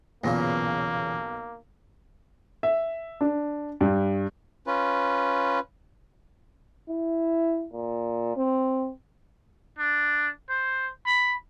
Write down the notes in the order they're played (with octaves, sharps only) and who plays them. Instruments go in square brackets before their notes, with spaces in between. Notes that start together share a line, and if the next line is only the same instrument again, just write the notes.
[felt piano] B1 B3 A#6 [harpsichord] E2 A#2 C#3 [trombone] A#3
[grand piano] E5
D4
G2
[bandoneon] C#4 F4 B4
[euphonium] E4
A#2
C4
[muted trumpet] D4
C5
B5